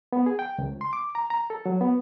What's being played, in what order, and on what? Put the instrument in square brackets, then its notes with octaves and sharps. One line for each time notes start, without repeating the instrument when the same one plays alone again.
[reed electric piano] B3
G#4
G5
C#2
C6
D6
A#5
A#5
A4
F#3
B3